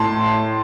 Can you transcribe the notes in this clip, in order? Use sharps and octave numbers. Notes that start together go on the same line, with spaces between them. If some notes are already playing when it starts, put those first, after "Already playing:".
Already playing: A2 A5 C6